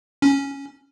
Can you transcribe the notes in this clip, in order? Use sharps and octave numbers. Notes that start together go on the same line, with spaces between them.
C#4